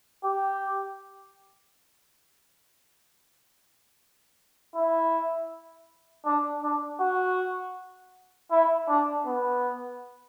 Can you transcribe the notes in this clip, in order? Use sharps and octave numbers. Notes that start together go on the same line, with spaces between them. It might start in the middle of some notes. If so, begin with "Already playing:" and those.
G4
E4
D4
D4
F#4
E4
D4
B3